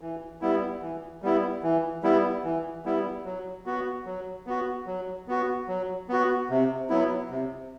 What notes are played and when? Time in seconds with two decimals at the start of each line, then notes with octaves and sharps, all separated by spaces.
0.01 E3
0.41 G3 B3 E4
0.82 E3
1.22 G3 B3 E4
1.63 E3
2.03 G3 B3 E4
2.44 E3
2.85 G3 B3 E4
3.25 F#3
3.66 B3 F#4
4.06 F#3
4.47 B3 F#4
4.87 F#3
5.28 B3 F#4
5.68 F#3
6.09 B3 F#4
6.50 C3
6.90 F#3 B3 E4
7.30 C3